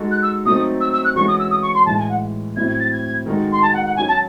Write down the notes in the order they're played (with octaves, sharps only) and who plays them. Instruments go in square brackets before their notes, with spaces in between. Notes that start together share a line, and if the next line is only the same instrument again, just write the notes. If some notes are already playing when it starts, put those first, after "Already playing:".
Already playing: [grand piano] G#3 D#4 F#4 A4
[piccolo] F#6
E6
[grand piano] F#3 A3 C4 D#4 A4 [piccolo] D#6
[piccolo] E6
E6
F#6
[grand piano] E3 G#3 C#4 F#4 A4 [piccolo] C#6
[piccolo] D#6
E6
D#6
C#6
C6
[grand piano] A2 E3 G#3 [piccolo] A5
[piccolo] G#5
F#5
[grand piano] A2 F#3 A3 C4 E4 [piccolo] G#6
[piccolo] G#6
A6
G#6
[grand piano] D#3 G#3 D#4 F#4 A4
[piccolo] C6
A5
F#5
F#5
[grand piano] F#3 C#4 F#4 [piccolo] G#5
[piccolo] A5